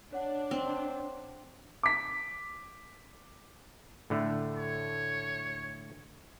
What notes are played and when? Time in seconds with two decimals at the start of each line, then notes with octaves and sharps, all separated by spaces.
0.13 D4 C#5 F#5
0.51 C4
1.83 D6 B6
4.10 A2 D3 A3
4.58 C#5